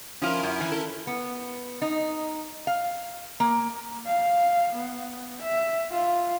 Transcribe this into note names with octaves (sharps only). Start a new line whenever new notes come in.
F3 C#4 E4 F4 A#4
F#2
E3
A4
B3
D#4
F5
A#3
F5
B3
E5
F4